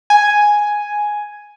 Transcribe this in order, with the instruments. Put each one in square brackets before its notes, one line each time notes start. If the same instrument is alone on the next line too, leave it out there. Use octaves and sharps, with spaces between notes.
[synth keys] G#5